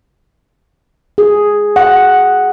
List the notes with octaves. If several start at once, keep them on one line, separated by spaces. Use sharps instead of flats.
G#4
F#5